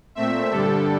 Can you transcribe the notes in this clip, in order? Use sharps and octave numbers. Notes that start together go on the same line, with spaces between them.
A#2 A3 C4 E5
G2 D3 G3 D4 A4